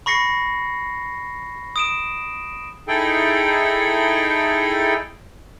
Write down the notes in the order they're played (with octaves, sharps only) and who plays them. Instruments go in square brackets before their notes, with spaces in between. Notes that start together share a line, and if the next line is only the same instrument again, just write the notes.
[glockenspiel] B5 C#6 A#6 C7 C#7
D#6 D7 E7
[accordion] D#4 E4 G#4 A4 G5